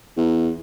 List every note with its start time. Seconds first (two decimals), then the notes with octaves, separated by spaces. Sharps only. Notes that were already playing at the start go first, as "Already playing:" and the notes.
0.17 E2